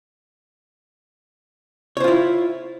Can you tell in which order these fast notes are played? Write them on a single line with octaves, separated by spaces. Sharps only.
C#5 C5 F4 E4